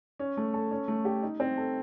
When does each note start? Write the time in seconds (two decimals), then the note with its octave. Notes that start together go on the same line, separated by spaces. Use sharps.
0.19 C#4
0.37 A3
0.54 A4
0.71 C#4
0.88 A3
1.05 G4
1.23 D#4
1.40 C4
1.57 A4